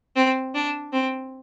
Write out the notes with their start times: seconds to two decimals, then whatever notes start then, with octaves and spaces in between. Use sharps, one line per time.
0.16 C4
0.55 D4
0.93 C4